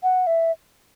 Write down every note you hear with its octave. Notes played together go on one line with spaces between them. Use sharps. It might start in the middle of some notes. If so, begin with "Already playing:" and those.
F#5
E5